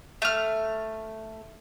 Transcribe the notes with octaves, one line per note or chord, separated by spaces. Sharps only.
A3 F6